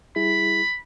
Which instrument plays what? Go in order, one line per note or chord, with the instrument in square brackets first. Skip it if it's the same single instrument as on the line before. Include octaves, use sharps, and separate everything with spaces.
[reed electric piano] G3 E4 G#4 [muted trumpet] B5